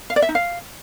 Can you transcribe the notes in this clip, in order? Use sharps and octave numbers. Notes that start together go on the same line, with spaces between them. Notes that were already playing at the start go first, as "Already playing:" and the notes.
F5
D5
E5
D#4
F5